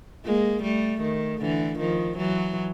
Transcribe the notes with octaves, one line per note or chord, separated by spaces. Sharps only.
G#3 A#3
G3 A3
D#3
D3 E3
D#3 F3
E3 F#3